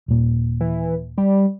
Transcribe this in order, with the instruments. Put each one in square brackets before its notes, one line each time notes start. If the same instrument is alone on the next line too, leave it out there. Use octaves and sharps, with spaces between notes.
[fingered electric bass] D#1 A#2
[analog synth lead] E3
G3